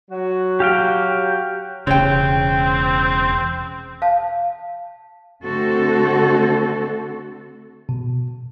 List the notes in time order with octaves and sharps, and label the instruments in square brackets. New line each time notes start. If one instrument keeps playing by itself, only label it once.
[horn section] F#3 F#4
[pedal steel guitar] G4 F5 G5
[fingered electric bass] E1 C#3 [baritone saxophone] C4 [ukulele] C#5 G5
[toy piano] F5 A5
[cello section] D3 A3 C4 F#4 A4
[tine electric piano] B2